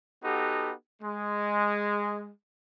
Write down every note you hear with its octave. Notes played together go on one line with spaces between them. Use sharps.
B3 D#4 F#4 G4 A4
G#3